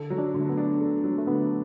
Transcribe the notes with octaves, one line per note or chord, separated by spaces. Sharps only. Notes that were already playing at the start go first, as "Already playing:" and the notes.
Already playing: D3 A4
F#3
D4
D3
A3
B3
D4
A4
F#3
A3
D3 B3